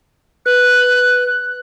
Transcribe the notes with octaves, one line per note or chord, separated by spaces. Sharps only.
B4 F#6